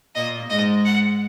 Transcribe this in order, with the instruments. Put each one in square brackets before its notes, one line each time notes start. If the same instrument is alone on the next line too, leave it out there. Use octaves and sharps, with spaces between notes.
[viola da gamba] A#2 A#3 [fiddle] D#5
[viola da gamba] G#2 G#3 [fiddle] D#5
[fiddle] F#5